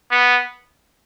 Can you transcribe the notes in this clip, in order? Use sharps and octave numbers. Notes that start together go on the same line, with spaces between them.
B3